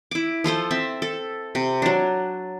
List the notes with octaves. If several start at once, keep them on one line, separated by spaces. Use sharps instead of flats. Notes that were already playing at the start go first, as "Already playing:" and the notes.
E4 D6
F3 F4 A4 C5
C4 E5
A4
C3
F#3 D4